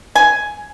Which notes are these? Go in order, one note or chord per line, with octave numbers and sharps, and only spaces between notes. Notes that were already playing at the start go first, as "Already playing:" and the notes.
G#5